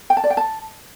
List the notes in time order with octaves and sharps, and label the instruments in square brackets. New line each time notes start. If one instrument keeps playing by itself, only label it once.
[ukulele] G5
A5
D5
G5
A5